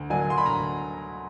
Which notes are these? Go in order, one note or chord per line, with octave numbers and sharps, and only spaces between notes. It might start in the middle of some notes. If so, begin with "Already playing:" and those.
Already playing: D2
D3 F#3 A#3 D4 G#5
C6
B5
D2 A#5